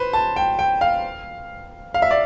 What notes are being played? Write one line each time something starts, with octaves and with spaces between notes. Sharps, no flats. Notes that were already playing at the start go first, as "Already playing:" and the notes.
Already playing: B4 C5
A5
G5
G5
F5
F5
E5
D5